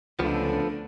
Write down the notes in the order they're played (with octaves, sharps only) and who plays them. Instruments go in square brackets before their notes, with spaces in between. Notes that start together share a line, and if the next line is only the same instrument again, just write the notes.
[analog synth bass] C#2 [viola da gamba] D3 A3 D4 [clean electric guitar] F3 B3 [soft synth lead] A4